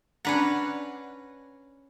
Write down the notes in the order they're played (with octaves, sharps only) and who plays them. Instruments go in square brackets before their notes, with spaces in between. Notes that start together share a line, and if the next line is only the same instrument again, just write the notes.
[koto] C#4 B4 A#5 [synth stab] D4 F#5